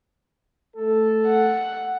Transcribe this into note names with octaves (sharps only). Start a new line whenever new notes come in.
A3 A4
F#5